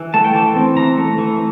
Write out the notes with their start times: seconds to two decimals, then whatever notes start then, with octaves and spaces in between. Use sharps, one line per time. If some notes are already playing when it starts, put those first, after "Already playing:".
Already playing: E3
0.14 A3 A5
0.24 G5
0.35 E3 A5
0.56 C4
0.77 E3 A#5
0.97 A3
1.18 E3